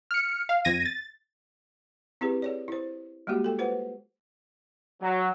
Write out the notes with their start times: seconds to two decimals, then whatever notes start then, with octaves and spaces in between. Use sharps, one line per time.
0.11 F6 C#7
0.49 F5
0.65 F2 G#6 A#6 D#7
0.86 A6
2.21 C4 E4 G4 G#4 B4
2.42 G#4 C#5 D5
2.68 E4 C5
3.27 G3 G#3 A#3 F#4 G4
3.44 A4 G5
3.59 F4 B4 C5 F#5
5.02 F#3